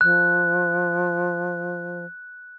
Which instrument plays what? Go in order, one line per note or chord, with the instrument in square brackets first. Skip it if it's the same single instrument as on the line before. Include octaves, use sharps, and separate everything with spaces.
[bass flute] F3 [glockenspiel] F#6